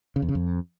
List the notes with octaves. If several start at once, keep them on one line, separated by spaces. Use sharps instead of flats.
C#3
E2
C#3
F2